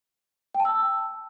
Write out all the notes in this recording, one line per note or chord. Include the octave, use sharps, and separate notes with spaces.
G5
A5
E6